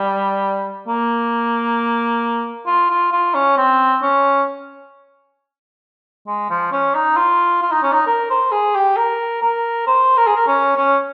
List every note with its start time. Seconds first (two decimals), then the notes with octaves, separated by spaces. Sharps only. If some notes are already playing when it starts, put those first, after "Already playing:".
Already playing: G3
0.87 A#3
2.66 F4
2.90 F4
3.12 F4
3.34 C#4
3.57 C4
4.02 C#4
6.27 G#3
6.50 F3
6.72 C#4
6.94 D#4
7.17 F4
7.62 F4
7.72 D#4
7.83 C#4
7.92 D#4
8.06 A#4
8.30 C5
8.51 G#4
8.75 G4
8.97 A#4
9.42 A#4
9.87 C5
10.17 A#4
10.27 G#4
10.36 A#4
10.47 C#4
10.77 C#4